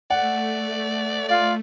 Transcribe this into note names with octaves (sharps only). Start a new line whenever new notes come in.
A3 D5 F#5
F4 D5